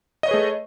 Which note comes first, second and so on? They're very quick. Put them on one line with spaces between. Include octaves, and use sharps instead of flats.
D#5 C#5 B4 G#4 A3